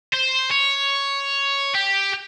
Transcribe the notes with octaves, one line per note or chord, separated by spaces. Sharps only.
C5
C#5
G4